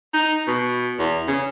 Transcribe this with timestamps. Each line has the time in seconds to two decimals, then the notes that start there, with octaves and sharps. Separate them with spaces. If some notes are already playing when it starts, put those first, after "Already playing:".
0.14 D#4
0.48 B2
0.99 E2
1.28 C#3